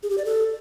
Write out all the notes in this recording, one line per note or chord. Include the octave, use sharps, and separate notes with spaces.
G#4
G4
D5
A4